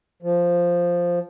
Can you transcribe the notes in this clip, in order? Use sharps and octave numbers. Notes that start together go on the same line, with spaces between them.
F3